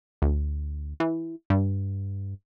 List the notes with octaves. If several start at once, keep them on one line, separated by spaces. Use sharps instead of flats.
D2
E3
G2